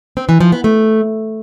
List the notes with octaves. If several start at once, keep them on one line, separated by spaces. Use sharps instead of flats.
C4
E3
F3
B3
A3